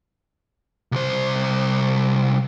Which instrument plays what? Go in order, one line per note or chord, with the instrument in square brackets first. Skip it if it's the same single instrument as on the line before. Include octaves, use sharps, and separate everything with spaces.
[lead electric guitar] C2 C5